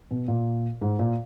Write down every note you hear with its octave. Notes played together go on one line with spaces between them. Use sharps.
B2
A#2
G#2
A#2